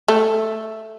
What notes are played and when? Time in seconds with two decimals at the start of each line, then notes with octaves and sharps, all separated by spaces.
0.08 A3